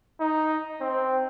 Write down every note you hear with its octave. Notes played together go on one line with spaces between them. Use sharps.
D#4
C4